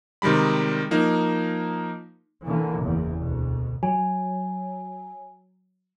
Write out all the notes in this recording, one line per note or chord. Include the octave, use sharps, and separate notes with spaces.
C3 D#3 G3 G#3 B5
F3 A#3 D#4
D3 E3 A#3
F#1 E2
D2 B2
F#3 G#5